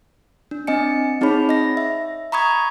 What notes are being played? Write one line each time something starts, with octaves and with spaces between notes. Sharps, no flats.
D4
C4 D#5 G#5 C#7
C4 D#4 G#4 C#5 B5
D#5 A#6
E5
A#5 B5 C#6 D#6 G#6